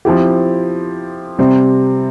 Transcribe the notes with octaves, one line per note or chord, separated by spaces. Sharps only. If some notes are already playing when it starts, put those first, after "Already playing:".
F3 C4 E4 G4
C3 G3 C4